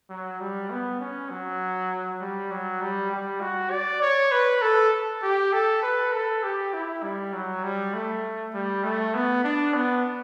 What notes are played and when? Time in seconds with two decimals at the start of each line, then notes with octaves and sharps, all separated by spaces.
0.10 F#3
0.40 G3
0.70 B3
1.00 C#4
1.30 F#3
2.21 G3
2.51 F#3
2.81 G3
3.12 G3
3.41 F#4
3.71 D5
4.02 C#5
4.32 B4
4.62 A4
5.22 G4
5.53 A4
5.82 B4
6.13 A4
6.43 G4
6.73 E4
7.03 G3
7.33 F#3
7.64 G3
7.93 A3
8.54 G3
8.84 A3
9.14 B3
9.44 D4
9.74 B3